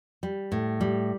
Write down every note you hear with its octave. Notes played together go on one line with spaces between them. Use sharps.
G3
A2
G3